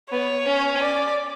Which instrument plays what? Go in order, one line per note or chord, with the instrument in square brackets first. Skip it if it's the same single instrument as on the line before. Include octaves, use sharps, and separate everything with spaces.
[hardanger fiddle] B3 [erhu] C#5
[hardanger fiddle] C#4
[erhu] D5